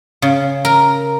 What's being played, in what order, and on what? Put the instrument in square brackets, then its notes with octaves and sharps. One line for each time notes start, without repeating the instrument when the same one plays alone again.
[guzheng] C#3
A#4